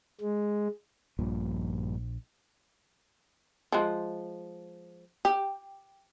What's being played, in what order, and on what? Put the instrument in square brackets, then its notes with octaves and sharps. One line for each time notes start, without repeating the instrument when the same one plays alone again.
[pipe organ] G#3
[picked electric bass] A#1 [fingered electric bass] G2 A#2 F3
[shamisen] F3 G#3
G4